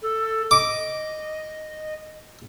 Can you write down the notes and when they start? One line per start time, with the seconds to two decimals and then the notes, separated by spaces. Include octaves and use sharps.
0.02 A4
0.51 D#5 D6